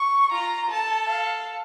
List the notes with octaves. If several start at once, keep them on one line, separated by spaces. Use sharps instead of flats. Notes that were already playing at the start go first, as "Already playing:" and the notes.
Already playing: C#6
F4 A#5
A4 A5
F5